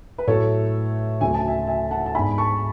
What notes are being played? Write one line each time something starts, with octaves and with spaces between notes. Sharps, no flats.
B4
A2 F#3 A3 A4 C#5
D2 C#3 F#3 A3 G#5
A5
E5 G#5
E5 G#5
F#5 A5
A5
G#2 G#3 B3 D4 G#5 B5
A5 C#6